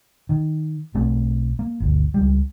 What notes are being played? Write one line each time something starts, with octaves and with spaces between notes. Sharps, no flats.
D#3
B1 A3 C4
A#3
G1 D2
C#2 G3